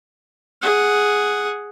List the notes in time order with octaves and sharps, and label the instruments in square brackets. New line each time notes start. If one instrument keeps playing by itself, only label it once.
[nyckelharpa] G#4 F#5